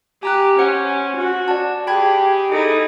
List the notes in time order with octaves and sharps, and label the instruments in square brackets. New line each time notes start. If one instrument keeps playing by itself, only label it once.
[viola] G4 [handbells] G#5 A#5 F#6
[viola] C#4 [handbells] C5 F#5 G#5
[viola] F#4
[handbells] D5 F#5 A5
[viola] G4 G#4 [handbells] G5 B5 G#6
[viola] D#4 E4 [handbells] G#4 A4